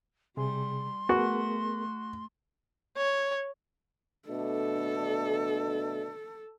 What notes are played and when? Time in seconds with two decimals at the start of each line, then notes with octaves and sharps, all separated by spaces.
0.37 C3 G3 G#4 C6
1.09 A3 B3 F#4 G#4 A#4
2.97 C#5
4.29 B2 A3 D4 A4